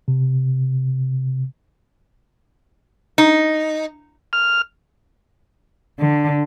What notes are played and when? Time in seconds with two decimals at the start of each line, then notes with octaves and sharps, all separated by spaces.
0.08 C3
3.18 D#4
4.33 F6
6.00 D3